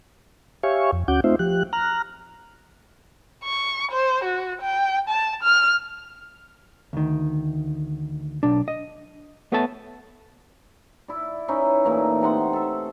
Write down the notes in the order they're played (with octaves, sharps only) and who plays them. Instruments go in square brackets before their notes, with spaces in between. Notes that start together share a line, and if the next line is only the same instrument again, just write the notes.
[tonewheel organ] G4 C#5 E5 F5 G#5 C#6
F2
D2 C#4 F#4 F#5 D6 G6
A3 C4 D#4 F4 C5 E5
F3 G4 F#6
A#5 F6 F#6
[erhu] C#6
C5
F#4
G5
A5
F6
[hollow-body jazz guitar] D2 D#3
B1 D4
D#5
A3 B3 A4 C#5 E5 A5
[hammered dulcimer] E4 D5
C#4 D#4 E4 B4
A#2 E3 A3 D#4
C3 D#4 F#5 C6
A4 E5